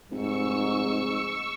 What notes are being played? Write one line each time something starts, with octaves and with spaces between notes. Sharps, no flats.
F1 G#2 C#6 E6 C#7